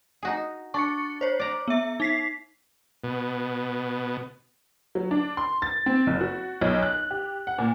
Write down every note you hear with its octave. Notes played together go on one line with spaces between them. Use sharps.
D#4 F#4 G#4
D4 C#6 A6 C#7
C5 C#5
D5 A#5
B3 E5
D#4 B6 C7
B2
F#3
D4
C6
A6
C4
F#1
F#4
B1
F#6
G4
F#5
A#2